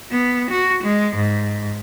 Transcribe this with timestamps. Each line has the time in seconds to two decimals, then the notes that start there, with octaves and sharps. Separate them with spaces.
0.11 B3
0.51 F#4
0.83 G#3
1.16 G#2